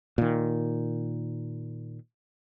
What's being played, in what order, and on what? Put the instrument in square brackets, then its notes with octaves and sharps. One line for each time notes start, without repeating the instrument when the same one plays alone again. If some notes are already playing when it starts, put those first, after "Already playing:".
[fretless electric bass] A#2 D#3